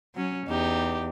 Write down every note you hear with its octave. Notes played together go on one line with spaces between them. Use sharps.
F#3 C#4
E2 D#4 G4